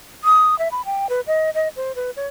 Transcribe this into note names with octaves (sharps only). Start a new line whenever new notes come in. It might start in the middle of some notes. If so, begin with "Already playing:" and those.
D#6
E5
B5
G5
B4
D#5
D#5
C5
B4
C#5